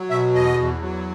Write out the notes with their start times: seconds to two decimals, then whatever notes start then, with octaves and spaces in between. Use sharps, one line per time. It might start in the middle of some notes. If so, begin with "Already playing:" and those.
Already playing: F#3
0.10 B2 E5
0.34 E2 D#5
0.58 E2
0.81 F#3